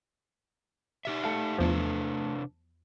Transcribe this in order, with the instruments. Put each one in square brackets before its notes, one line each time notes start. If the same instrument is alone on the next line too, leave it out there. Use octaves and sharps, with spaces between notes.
[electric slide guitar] D#4 G4 E5
[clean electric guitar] A3 A4 F5
[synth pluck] E2 F3 [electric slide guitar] C3 D4 B4